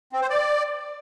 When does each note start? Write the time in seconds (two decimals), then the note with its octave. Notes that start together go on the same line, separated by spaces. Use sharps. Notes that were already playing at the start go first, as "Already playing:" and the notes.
0.13 C4
0.21 C5
0.30 D5